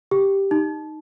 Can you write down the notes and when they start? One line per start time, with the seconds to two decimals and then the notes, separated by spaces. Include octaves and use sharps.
0.11 G4
0.51 D#4